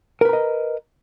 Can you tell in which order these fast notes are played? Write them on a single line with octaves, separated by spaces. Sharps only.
A#4 B4 A#5 D#5